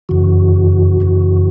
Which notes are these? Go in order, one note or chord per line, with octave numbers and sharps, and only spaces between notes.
F#2 C#3 E3 F#4
F#2 C#3 E3